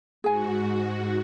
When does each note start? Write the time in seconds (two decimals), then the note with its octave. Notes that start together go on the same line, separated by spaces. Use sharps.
0.24 G#2 F#4 G#4 G#5